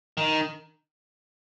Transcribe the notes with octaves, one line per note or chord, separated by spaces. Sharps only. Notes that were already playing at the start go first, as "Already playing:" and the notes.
D#3